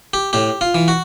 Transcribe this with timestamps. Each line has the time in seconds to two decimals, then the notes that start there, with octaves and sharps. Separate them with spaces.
0.14 G4
0.33 A2 G4
0.61 F4
0.75 E3
0.88 F#4